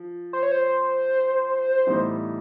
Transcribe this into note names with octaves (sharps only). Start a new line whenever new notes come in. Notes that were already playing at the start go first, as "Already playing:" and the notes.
Already playing: F3
C5
C#5
C5
A2 E3 G3 B3 D#4